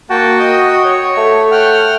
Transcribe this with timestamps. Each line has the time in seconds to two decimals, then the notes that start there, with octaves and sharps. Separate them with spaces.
0.10 A#3 F#4 G5 A5
0.39 D#5 G5 D#6
0.84 C#5
1.17 A3
1.51 F#5 G5 F6